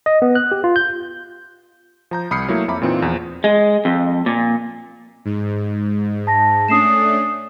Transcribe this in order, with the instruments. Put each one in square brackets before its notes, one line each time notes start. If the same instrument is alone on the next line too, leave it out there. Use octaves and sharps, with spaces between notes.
[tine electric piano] D#5
B3
F#6
G4
F4
G6
[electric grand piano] F3 A#5 G6
C2 B5 D#6 F6 C7 C#7
F#3 A3 A#3 E4
F2 E5 A#5 B5 D6
A#2 E3 C4 D#4 F4
E2 F3
[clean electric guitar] G#3
F2
A#2
[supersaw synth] G#2
[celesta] A5 A#6
[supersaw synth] A3 C#4 D4 [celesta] D#6 C7 E7